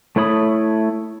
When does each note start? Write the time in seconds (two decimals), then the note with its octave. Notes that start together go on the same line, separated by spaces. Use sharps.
0.16 A3 E4 C#5 B5 D#6